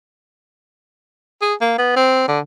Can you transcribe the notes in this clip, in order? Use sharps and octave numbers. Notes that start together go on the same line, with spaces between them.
G#4
A#3
B3
C4
D3